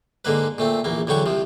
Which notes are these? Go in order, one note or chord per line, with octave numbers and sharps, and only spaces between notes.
G#2 D3 A#3 B4
A#2 A3 C4
A#1 E2 A#3
E2 D3 F#3 G5 C#6
C2 C3 F3